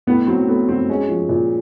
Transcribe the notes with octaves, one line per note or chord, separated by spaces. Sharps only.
A2 B3
F#3 C4
A3 B3
F#3 C4
G#3 C#4
F3
A#2